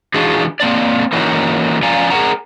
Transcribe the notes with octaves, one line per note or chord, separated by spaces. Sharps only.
E3 D4 D#4 F4 F#4 G#4
A#3 C4 D4 D5
E3 A#3 C#4 D#4 E4 F#4
F3 C#4 D5 F5 G#5 A#5
G#4 A#4 F#5 A#5